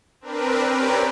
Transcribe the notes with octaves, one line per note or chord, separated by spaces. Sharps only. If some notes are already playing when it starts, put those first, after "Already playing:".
C4 D4 A#4 B4
C4 C#4 G4 A#4 B4 D5